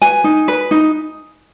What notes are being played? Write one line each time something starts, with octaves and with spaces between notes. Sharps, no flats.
B4 G#5
D#4
B4
D#4